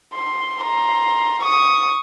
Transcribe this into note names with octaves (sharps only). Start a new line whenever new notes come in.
C6
A#5 C6
C#6 D#6